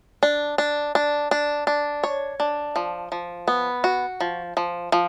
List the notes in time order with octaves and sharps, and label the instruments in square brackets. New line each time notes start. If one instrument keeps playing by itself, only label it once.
[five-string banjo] D4
D4
D4
D4
D4
C#5
D4
F3
F3
B3
F#4
F3
F3
F3